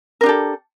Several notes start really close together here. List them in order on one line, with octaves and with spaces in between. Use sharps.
A#4 D4 G4 A4